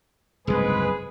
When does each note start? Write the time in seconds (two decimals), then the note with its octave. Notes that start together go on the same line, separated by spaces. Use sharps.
0.47 F#1 C2 G#2 G#3 G#4 B4